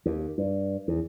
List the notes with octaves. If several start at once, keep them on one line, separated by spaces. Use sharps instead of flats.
D#2
G2
E2